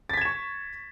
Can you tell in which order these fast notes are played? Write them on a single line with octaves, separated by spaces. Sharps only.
A6 B6 G#6 E7 C#6